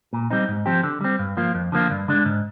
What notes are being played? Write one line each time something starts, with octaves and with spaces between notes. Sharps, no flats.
A#2
G3 C4 D#4
G#2
F3 C4 G4
D3
G3 C4
G2
F3 A#3 F4
F2
D3 F3 A#3 F4
G2
D3 G#3 D4
G#2